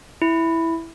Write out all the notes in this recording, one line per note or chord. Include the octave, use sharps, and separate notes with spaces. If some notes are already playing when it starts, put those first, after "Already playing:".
E4